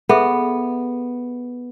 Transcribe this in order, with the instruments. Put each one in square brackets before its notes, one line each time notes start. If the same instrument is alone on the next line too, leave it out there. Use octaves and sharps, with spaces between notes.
[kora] B3 [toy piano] G#4 A4 E5